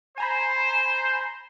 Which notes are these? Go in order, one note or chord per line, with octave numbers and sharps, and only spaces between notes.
C5 G#5 A#5 B5